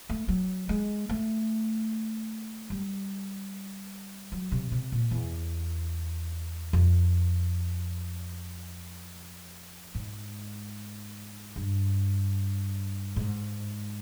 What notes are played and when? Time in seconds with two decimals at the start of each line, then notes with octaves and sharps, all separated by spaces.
0.09 A3
0.28 F#3
0.69 G#3
1.09 A3
2.70 G3
4.32 F#3
4.52 C3
4.72 C3
4.92 A#2
5.11 E2
6.73 F2
9.95 G#2
11.56 G2
13.16 G#2